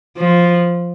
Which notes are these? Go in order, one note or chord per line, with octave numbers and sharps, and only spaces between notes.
F3